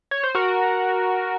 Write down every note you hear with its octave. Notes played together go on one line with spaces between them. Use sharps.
C#5
C5
F#4 A#4